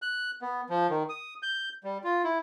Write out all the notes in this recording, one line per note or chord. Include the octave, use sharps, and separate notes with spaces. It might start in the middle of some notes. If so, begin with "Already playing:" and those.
F#6
B3
F3
D#3
D#6
G6
G3
F4
E4